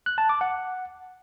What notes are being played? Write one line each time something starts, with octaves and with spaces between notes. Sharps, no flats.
F#6
A5
D6
F#5